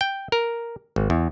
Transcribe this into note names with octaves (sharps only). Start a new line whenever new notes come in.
G5
A#4
G#1
E2